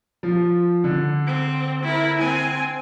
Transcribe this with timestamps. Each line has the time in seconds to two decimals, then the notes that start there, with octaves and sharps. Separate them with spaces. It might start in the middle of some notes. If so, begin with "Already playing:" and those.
0.23 F3
0.84 D3
1.27 C4
1.83 E4 A#4
2.18 C4 G#5